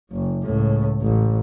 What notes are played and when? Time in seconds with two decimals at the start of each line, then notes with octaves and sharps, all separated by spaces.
0.11 F#1
0.44 C#2 A2
1.02 A1